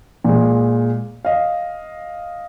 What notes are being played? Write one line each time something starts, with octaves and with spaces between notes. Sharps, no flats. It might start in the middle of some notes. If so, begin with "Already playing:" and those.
A#2 G#3
D#5 F5